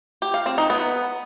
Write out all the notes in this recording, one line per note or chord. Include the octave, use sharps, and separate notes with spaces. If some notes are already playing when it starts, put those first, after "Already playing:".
G4
F5
C4
D#4
B3